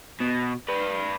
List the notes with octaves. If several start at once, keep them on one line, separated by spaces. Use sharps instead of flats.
B2
B4 D5